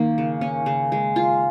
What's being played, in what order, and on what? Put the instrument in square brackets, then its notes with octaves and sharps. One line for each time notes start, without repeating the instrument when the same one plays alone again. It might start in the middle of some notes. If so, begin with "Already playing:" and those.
Already playing: [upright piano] D#3 [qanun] A#3
[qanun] C#3
C#4
C#3
G#3
F4